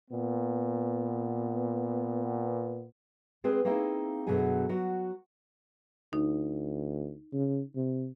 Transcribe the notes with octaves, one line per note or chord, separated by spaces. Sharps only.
A#2 B3
G#3 C4 G#4 B4 G#5
A#3 C4 D#4 E4 G#4
F#2 B2 D3 F#3 G#4 G#5
F#3 F#4
D2 D#4
C#3
C3